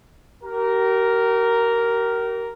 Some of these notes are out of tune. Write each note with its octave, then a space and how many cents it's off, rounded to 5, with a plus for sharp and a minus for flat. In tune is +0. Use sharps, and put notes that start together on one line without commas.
G4 -40 A#4 +0